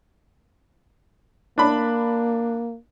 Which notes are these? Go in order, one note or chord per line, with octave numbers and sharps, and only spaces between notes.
A#3 D4 B5